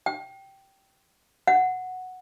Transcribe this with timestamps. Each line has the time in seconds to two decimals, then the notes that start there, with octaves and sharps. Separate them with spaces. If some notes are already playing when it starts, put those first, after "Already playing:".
0.06 G5
1.47 F#5